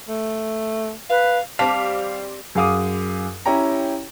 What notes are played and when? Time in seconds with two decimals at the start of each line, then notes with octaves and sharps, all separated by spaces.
0.08 A3
1.10 B4 F5
1.59 G3 C4 F5 A5 D6 B6
2.55 F#2 G#4 F5 D6 D#6
3.46 C#4 E4 G4 C#5 G5 A#5